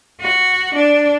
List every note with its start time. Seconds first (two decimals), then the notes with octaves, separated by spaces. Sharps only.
0.20 F#4
0.74 D4